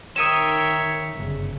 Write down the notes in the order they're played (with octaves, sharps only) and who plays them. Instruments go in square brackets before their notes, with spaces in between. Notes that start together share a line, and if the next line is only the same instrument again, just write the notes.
[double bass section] D#3 [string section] A#4 G5 [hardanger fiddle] C#5 E5 [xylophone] D#6 D#7 E7
[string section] G1 [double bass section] F#2 C#3